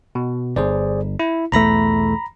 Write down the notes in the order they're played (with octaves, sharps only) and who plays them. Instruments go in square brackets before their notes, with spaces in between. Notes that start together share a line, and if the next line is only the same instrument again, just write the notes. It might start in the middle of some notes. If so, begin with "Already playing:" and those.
[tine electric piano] B2
[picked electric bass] G1 [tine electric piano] G#4 C5 D5
[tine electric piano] E4
[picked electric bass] B1 E2 A3 [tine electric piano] A#5 B5 A#6